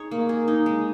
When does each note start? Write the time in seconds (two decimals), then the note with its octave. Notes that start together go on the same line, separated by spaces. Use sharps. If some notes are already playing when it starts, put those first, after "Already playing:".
Already playing: D#4 G#4 C#5
0.11 A#3
0.29 G#4
0.48 D#4
0.66 G#3